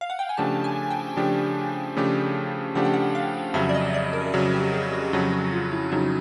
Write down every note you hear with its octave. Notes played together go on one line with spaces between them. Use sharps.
F5
F#5
G5
G#5
C#3 F3 A3 D4 G4 A5
G#5
G5
C#3 F3 A3 D4 G4
C#3 F3 A3 D4 G4
C#3 F3 A3 D4 G4 F#5
G5
F#5
F5
F2 C#3 F#3 E5
D5
D#5
D5
A#4
F2 C#3 F#3
G4
G#4
F#4
F2 C#3 F#3 F#4
F#4
F4
E4
F2 C#3 F#3 D#4